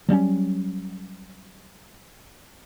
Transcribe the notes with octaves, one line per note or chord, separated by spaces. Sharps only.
F#3 G3 C4 C#4